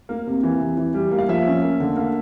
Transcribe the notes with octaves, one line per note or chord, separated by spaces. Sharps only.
A#3
C3
E3
C3
E3
G3
A#3
F5
F3 E5
C#4
A#3
D3
A#3